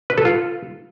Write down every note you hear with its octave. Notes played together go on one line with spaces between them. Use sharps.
B4
A4
F4